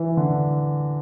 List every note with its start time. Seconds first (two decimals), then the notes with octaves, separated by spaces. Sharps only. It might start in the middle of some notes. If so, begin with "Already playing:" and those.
Already playing: E3
0.17 D3